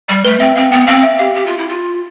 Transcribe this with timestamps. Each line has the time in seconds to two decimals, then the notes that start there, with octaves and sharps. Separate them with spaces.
0.09 G3
0.25 A3 B4
0.40 C4 E5
0.56 C4 F5
0.72 B3 G5
0.87 C4 F5
1.03 E5
1.19 G4 F5
1.35 G4
1.46 F4
1.58 E4
1.69 F4